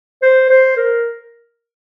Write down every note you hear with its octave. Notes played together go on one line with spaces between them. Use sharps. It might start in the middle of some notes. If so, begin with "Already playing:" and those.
C5
C5
A#4